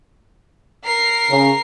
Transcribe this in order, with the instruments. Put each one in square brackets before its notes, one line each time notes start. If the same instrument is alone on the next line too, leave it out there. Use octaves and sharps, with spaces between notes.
[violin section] A#4 C7
[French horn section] C#3